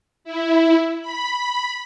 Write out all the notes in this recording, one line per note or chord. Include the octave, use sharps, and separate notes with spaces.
E4
B5